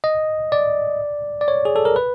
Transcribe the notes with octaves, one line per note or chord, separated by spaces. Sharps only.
D#5
D5
D5
C#5
G#4
A4
A#4
B4